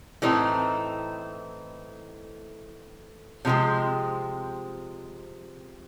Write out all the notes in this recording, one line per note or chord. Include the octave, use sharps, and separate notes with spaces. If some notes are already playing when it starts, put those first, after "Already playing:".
A2 E3 A3 C4 D#4
C3 F3 G#3 C4